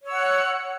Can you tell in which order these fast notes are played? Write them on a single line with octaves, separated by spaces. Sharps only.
C#5 E6 F#5